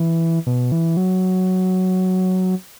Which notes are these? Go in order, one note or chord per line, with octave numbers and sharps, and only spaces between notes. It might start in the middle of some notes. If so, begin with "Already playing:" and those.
Already playing: E3
B2
E3
F#3